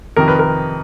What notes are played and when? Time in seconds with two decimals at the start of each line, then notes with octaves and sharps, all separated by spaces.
0.16 F2 C3 D#3 A#4
0.28 B4
0.39 A#4